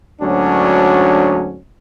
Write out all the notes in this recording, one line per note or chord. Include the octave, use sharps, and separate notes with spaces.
D2 G#2 F#3 C#4 D4